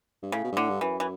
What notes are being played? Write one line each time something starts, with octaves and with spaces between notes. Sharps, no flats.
G2
A2 C#3
B2
G2
A2 D3
G2
F#2 E3
E3